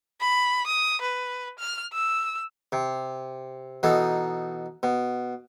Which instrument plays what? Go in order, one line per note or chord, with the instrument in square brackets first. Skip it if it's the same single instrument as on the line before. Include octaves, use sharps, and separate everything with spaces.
[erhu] B5
D#6
B4
F6
E6
[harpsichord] C3
B2 E3 D#4 A4
B2